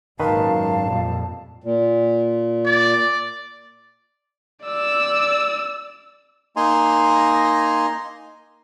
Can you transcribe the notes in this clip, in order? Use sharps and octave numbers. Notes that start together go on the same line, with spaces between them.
G#1 F#2 A#2 D#3 B4 F5 A5
F2 A#2 G3
A#2
D5
D5 E6
A#3 D#4 D#5 G#5 A#5 C6